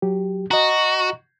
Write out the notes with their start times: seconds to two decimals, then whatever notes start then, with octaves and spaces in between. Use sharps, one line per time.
0.02 F#3 G4
0.51 F#4 D#5 A#5